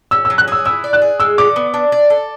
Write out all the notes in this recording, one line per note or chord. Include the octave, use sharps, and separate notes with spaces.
C#4 E6
E6
F#3
F#6
G#4 E6
E4 E6
D5
F#6
G#4
G#3 E6
D3 D6
B3
D4
D5
A4